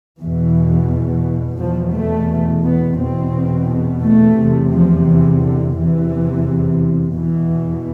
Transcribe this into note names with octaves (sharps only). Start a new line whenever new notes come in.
E2 B2 E3
E2 B2 F3
A3
B3
E2 B2 C4
A3
E2 C3
F3
E3
D3
E2 C3 E3
E2 B2 E3